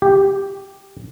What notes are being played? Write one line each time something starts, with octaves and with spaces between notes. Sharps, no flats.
G4